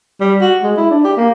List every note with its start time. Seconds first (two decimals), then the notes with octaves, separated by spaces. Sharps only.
0.20 G3
0.41 F#4
0.63 G#3
0.77 E4
0.90 D4
1.04 G4
1.17 A#3